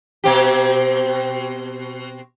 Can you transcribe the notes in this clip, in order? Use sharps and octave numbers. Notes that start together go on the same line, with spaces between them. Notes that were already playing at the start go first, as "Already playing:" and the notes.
B2 C4 G4